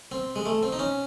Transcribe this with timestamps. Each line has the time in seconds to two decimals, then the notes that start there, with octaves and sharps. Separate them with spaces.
0.12 C4
0.36 G#3
0.46 A3
0.63 C4
0.72 D#4
0.79 C#4